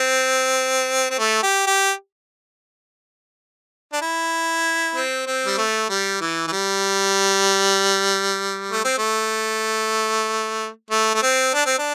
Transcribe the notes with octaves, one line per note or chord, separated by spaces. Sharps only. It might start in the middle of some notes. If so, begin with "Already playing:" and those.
Already playing: C4
C4
A3
G4
G4
D4
E4
C4
C4
G3
A3
G3
E3
E3
G3
A3
C4
A3
A3
A3
C4
D4
C4
D4